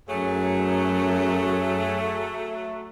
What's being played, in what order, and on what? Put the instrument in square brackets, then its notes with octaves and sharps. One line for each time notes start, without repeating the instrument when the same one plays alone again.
[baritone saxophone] F#2 [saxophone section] F#3 A3 [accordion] G#4 C#5